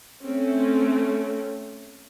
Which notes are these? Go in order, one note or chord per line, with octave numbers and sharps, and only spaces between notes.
A3 C4 C#4